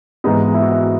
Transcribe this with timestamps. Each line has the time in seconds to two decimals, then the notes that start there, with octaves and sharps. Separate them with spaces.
0.24 G#2 E3 G#3 B3 D#4
0.54 E4
0.62 F#4
0.70 E4
0.84 E4